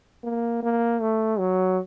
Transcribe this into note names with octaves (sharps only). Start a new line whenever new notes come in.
A#3
A#3
A3
F#3